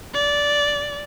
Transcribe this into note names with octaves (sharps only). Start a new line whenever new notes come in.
D5